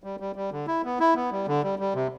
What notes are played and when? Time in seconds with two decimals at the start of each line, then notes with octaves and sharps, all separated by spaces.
0.04 G3
0.20 G3
0.36 G3
0.52 D3
0.67 E4
0.84 B3
1.00 E4
1.16 B3
1.32 G3
1.48 D3
1.63 G3
1.79 G3
1.95 C3